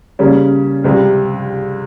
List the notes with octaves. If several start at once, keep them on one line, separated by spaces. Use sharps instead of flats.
C#3 G3 A#3 C#4
C#2 C3 G3